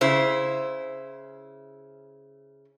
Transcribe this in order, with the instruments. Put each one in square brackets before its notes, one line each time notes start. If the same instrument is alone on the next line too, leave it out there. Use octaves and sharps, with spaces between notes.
[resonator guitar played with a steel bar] C#3 E4 C5